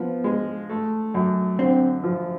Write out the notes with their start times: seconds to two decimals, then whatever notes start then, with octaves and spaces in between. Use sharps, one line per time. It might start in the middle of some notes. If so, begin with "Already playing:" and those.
Already playing: F3 B3
0.24 G#3
0.69 A3
1.14 F#2
1.59 D3 C4
2.04 F3